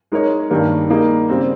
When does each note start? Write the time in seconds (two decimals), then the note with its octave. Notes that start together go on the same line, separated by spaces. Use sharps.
0.12 G#3 D#4 A#4 C#5
0.50 G2 D#3 G3 A#3
0.90 G3 A#3 D#4 G#4
1.29 C#3 G3 C4